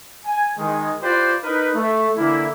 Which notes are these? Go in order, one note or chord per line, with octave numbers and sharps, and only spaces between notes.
G#5
D#3 G#3
F4 G4 B4 C5 D5
D#4 A#4 B4
A3
D3 E3 A#3 E4